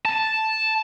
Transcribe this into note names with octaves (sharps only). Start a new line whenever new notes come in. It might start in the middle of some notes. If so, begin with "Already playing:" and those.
A5